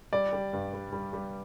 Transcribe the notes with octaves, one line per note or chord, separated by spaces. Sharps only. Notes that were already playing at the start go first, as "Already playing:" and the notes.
G3 D5
G3
G2
G3
G3
G3